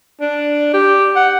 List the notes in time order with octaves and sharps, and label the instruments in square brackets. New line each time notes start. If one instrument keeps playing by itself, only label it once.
[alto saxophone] D4
G4
F#5